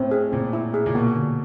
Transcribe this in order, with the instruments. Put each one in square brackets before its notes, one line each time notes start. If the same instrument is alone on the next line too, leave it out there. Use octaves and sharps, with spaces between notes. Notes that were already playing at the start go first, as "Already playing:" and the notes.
Already playing: [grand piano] A2 [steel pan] C4
[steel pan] G#4
[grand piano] A#2 [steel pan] C4
[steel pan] E4
G#4
[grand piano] A#2
[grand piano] B2 [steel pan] A#3
[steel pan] D3